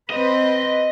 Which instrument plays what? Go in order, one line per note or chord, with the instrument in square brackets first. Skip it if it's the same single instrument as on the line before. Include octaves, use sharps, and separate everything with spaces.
[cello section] C4 B4 [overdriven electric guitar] D#5